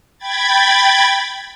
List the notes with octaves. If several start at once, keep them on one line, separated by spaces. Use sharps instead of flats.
G5 B5 G#6 A6